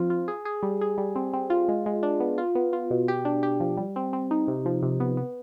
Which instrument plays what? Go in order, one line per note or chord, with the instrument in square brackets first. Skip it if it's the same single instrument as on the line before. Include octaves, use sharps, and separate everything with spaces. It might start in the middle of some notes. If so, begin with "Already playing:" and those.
Already playing: [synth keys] F3 C4 F4
F4
G#4
G#4
G3
G#4
G3
C4
C4
F4
G#3
G#3
D4
B3
F4
B3
F4
B2
G4
D4
G4
F3
G3
C4
C4
D#4
C3
F3
C3
B3
B3